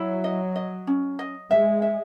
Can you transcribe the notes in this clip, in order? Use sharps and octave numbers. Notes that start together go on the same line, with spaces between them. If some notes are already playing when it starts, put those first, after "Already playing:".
Already playing: F#3 E4
D#5
D#5
C#4
D#5
G#3 E5
E5